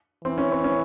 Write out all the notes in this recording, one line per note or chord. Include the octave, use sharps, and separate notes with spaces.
E3 C4
C#4
C4
C#4